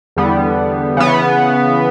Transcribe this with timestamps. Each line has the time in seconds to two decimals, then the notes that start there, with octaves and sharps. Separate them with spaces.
0.17 E2 D3 G3 B3
0.97 C#3 E3 B3